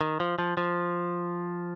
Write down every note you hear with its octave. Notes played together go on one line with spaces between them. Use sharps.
D#3
F3
F3
F3